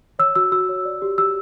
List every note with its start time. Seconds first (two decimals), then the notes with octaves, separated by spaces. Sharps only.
0.19 C#5 E6
0.35 F#4 E6
0.52 F#4 E6
0.69 C#5
0.85 D5
1.02 G4
1.18 G4 E6